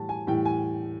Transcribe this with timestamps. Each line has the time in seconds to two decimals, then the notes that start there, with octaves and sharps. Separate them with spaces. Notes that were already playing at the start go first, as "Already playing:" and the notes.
Already playing: A2 E3 G3 A5
0.09 G#5
0.27 A2 E3 G3 G5
0.45 G#5